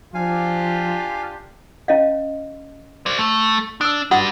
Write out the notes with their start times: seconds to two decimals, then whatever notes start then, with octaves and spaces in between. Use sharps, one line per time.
0.14 F3 D4 F4 G4 F5 G#5
1.88 C#4 D#5 F5
3.06 C5 D5
3.19 A3
3.81 D4 D#6 E6
4.11 G3 D4 F#4 F#5 D#6